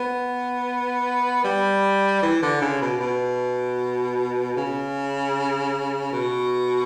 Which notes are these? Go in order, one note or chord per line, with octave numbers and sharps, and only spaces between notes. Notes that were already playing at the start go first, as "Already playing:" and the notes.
Already playing: B3
G3
E3
D3
C#3
B2
B2
C#3
B2